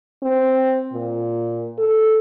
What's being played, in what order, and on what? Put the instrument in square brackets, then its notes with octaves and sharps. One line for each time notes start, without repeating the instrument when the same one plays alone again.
[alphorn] C4
A#2
A4